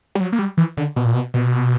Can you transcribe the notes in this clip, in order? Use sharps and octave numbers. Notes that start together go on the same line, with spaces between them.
G3
F#3
A#3
G3
E3
D3
B2
A#2
B2
B2